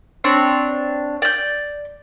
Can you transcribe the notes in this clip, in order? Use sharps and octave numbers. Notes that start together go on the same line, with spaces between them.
C4 D4 C#5
D5 G6